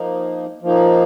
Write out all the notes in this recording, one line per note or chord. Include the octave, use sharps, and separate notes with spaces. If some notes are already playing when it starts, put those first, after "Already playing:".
Already playing: F3 A#3 D#4
F3 A#3 D#4